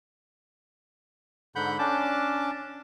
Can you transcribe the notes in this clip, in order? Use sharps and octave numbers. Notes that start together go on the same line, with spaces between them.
G#2 D3 F#5 B5 G6
C#4 D4 A5 D6